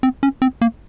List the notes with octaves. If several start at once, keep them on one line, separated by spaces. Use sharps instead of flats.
C4
C#4
C4
A#3